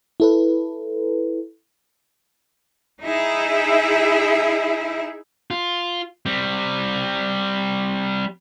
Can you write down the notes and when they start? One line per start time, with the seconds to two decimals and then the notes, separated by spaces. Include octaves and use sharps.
0.20 E4 A4 B4
3.02 D#4 E4 G#4 E5
5.51 F4
6.26 G3 C4